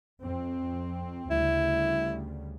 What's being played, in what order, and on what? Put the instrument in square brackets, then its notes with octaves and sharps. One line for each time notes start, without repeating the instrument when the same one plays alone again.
[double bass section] F2 C4
[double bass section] D2 C#3 G3 [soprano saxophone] E4